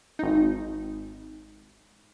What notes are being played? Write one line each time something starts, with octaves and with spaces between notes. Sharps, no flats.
G#1 D#4